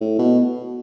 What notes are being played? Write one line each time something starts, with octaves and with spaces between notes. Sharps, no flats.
A2
B2